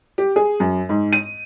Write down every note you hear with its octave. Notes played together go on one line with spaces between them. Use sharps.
G4
G#4
F#2
G#2
D#7